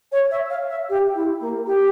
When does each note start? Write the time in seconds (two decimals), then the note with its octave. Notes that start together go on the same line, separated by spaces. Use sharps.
0.12 C#5
0.30 E5
0.49 F5
0.69 E5
0.89 G4
1.14 E4
1.40 A#3
1.66 G4